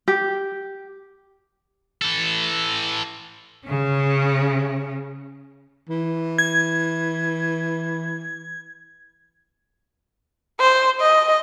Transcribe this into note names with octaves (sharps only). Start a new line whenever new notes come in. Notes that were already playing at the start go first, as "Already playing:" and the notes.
G4
E3 A4
C#3 C#4
E3
G#6
C5
D#5